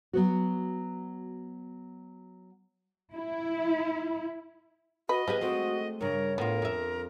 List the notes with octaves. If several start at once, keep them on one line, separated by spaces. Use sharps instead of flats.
F#3 B3 F#4
E4
F#4 B4 D#5
F3 B3 G4 G#4 B4
G#3 A3 C4 F#4
G2 C#3 A#4 C#5
A2 B3 F4 A#4
F2 E5